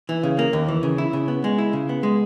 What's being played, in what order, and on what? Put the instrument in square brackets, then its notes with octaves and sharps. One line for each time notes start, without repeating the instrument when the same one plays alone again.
[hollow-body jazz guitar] E3
C#3
A#3
D#2
E3
C#3
E4
C#3
B3
G#3
E4
C#3
B3
G#3